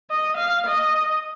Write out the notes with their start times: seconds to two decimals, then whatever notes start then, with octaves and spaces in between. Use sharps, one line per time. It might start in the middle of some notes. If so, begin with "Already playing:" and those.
0.10 D#5
0.37 F5
0.67 D#5